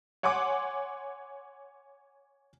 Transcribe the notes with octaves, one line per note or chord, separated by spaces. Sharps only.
C#5 F#5 G#5 C6 D6